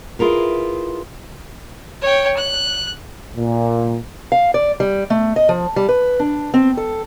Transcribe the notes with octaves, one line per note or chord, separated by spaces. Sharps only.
E4 F4 G#4 A#4 B4
C#5 G5
F#6
A#2
F5
D5
G3
A3
D#5
F3
G3
B4
D4
C4
A4